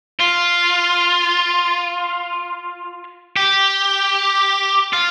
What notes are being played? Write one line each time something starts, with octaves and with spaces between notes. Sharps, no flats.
F4
G4
F4